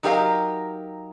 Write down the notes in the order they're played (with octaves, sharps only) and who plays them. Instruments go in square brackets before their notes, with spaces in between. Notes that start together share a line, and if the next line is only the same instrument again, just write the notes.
[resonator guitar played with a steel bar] F#3 D#4 G4 A#4 D#5 F5